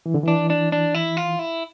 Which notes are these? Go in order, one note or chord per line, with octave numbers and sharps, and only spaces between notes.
E3
D3
E3 D4
D4
D4
E4
F4
E4